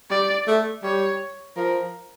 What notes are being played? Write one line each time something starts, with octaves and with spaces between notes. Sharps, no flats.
G3 D5
A3
G3 C#5
F3 A#4